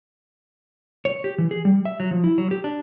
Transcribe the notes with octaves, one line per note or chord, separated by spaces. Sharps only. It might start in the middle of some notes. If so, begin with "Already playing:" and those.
C#5
G4
E3
G#4
G3
E5
F#3
F3
E4
F#3
G4
D4